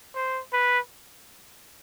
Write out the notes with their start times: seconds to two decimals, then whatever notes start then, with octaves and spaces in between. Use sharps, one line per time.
0.15 C5
0.53 B4